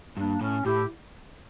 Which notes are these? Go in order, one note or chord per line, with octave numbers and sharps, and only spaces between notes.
G2 A#3 D4
A2 C#4
A2 E4 G4